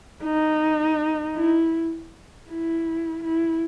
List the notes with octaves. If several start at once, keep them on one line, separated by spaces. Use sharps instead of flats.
D#4
E4
E4
E4